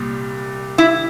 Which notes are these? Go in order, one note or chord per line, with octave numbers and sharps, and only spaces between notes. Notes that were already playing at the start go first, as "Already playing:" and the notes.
Already playing: C2 A#2 G3
E4